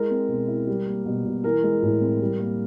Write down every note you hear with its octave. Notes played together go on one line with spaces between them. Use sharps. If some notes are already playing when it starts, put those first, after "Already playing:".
Already playing: G#3 E4 A#4
C4
B2
E4
G3
A#3
B2
B2
E3 A#4
G#3
A2
C4
G3
A#3